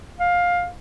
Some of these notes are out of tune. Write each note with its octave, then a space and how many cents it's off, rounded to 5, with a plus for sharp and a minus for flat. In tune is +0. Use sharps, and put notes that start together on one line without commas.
F5 +15